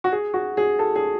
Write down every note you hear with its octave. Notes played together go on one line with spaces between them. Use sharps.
F#4
G#4
F#4
G#4
A4
G#4